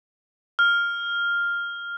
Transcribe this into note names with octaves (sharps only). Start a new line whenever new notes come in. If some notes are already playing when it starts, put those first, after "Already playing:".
F6